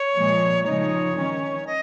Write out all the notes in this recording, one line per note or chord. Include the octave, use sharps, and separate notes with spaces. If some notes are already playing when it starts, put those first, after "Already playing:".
Already playing: C#5
A#2 F3 G#3
C#3 F3 G#3 D#4 C#5
D#3 C#4
D#5